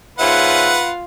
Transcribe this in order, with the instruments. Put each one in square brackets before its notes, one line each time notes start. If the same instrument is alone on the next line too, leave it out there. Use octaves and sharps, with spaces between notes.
[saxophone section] G#2 C#4 E5 [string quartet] F4 [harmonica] B4 F#5